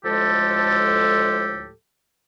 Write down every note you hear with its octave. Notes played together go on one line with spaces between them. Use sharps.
D2 A2 F3 G#3 G4 A4